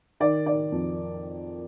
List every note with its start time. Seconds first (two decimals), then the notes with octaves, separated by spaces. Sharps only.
0.20 D#3 D5
0.46 D#3 D5
0.72 F2